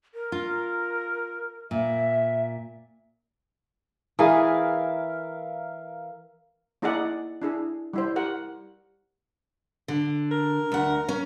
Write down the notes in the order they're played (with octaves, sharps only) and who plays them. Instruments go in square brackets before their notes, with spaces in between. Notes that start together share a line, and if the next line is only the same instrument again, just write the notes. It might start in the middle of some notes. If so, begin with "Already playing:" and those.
[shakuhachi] A#4
[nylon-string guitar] F4
[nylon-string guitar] A#2 [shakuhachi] E5
[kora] E3 G#4 [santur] A#4 E5 F5
[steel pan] A#3 D#4 E4 G#4 D5 F#5
D4 E4 G#4
G3 E4 C5
G4 A#4 F#5
[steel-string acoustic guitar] D3
[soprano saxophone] A#4
[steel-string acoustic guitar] D2 F#5
C#4